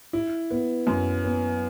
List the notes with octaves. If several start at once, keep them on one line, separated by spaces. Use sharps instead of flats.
E4
B3
F#2
B3